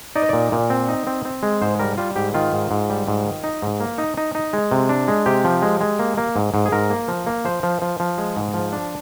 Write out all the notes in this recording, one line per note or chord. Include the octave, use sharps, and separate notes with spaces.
D#4 D5
D#5
A#2 D5
A#2
C4
D#4
C4
C4
G#3
G#2 C5
G3 A#4
G3 F4
G#2 G4
D#3 F4
G#2
G#2
G3
G#2
D#3
D#4
G#2
A#3
D#4
D#4
D#4
G#3
C3
D4
G#3
C3 G4
F3
G#3
G#3
A#3
A#3
G#2
G#2
G#4
G#2 A#4
A#3
F3
A#3
F3 C5
F3
F3
F3
G#3
G#2
F3
D4